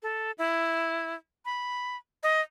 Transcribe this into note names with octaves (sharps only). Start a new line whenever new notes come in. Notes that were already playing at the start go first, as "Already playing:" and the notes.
A4
E4
B5
D#5